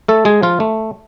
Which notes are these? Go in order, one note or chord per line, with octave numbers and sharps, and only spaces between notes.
A3 A4
G#3 G#4
F3 F4
A3